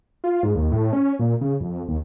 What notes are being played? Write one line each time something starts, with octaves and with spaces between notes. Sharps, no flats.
F4
G#2
D#2
A2
C#4
A#2
C#3
F2
D#2